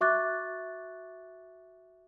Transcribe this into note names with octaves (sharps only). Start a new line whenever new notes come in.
F#4 E5 C#6 D6 F#6 A6